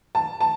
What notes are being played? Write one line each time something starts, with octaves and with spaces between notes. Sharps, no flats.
A5
A5